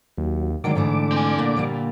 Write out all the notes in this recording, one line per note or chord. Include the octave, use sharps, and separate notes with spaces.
D#2 F#3
D3 D#3 F#3 G#3 D5 D6
G#2 D3 E3 A3
C4 G#5
A#2 A#3
D3 G3 A#3